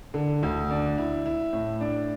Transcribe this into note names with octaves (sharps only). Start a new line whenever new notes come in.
D3
D2
D4
E4
E4
A2
D4